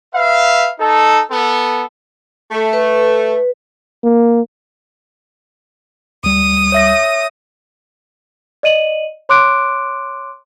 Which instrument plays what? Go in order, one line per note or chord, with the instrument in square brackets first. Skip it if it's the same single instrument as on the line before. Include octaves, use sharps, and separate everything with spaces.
[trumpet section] B4 E5 F5
D#4 A4
B3 A4
[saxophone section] A3
[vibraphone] B4
[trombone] A#3
[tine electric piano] D2 G3 [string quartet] D#6
[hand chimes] C#5 E5 A#6
[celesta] D5 D#5 D#7 F#7
C#5 C6 D6 F#6 D7